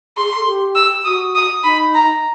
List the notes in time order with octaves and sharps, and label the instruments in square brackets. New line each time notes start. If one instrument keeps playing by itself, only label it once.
[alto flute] G#4 [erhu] C6
[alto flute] A4
G4
[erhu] E6
[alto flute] F#4 [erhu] D#6
[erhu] D#6
[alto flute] D#4 [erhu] B5
[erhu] A#5